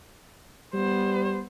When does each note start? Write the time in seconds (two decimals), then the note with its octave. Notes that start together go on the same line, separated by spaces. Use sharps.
0.74 G3 B3 C5